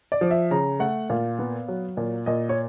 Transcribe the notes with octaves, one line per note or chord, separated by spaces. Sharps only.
D5
F3
E5
C#3 A#5
A3 F#5
A#2 F5
B3
F#3
A#2
A#2 D#5
C#5